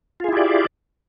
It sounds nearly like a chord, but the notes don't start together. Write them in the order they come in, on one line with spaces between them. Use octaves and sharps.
F4 G#4 E4 G4 D5